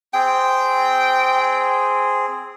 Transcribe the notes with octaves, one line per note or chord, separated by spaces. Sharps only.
C4 G#4 G5